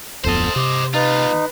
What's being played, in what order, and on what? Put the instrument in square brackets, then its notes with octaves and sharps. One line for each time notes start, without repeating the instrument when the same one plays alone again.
[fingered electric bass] D1 F2 B3 [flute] A4 [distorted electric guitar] C5 D#5
[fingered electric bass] C3 [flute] D6
[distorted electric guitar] D#2 F4 [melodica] D#4 [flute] B4